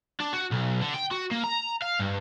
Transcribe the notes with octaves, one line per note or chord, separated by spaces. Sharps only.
D4
F#4
B1
D3
G5
F#4
A#3
A#5
F5
G2